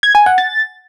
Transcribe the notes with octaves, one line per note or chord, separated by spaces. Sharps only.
G#6
G#5
F#5
A6